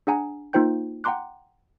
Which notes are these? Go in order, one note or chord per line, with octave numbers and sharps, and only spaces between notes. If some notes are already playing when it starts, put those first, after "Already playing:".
D4 G#4 F#5 G#5 A#5
A#3 D#4 F4 C5 G5 G6
F#5 G5 A#5 C6 D6 F#6